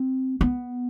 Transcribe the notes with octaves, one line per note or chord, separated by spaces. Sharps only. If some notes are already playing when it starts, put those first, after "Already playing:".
Already playing: C4
B3